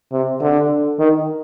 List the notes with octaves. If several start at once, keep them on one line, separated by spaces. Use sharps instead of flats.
C3
D3
D#3